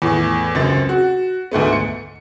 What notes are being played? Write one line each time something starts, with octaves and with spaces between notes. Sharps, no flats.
E2 A2
C#2 F#2 C4 A6
F#4
D2 G#2 A3 B3
C#7